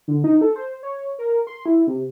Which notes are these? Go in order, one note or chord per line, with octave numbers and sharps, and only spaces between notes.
D3
D#4
A4
C5
C#5
A#4
C6
E4
C3